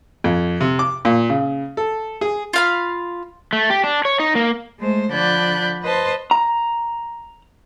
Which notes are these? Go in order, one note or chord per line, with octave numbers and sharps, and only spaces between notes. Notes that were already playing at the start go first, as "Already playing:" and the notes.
F2
C3
D6
A#2
C#3
A4
G#4
F4 F5 B5
A3
G4
D4
C#5
D#4
A#3
G#3 A3 C5
D3 F3 D5 B5 F#6 G6
B4 C5 D#5 A5 C6
A#5